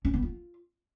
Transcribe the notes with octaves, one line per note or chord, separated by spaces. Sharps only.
C#4
B3
F4